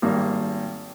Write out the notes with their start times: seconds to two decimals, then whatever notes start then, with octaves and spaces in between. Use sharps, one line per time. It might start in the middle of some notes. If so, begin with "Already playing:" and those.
0.02 G#1 G3 A#3